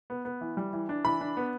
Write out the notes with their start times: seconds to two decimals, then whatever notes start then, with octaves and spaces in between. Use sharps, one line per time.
0.10 B3
0.25 B3
0.41 E3
0.57 G3
0.73 E3
0.89 D4
1.04 E3 B5
1.21 D4
1.37 B3